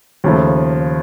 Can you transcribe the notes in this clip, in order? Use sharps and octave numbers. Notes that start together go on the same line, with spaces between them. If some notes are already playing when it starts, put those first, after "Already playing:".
D#2 C#3 F3 A3